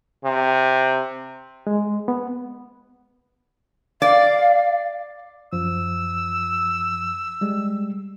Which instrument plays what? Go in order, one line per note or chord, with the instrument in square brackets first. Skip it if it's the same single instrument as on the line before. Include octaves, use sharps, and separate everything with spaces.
[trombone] C3
[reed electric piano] G#3
B3
[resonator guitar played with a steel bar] D5 [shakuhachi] F5
[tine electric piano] F#2 F3 [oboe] E6
[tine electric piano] G3 G#3